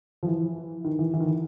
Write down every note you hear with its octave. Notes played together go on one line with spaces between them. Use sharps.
F3
E3
D#3
E3
E3
D#3
E3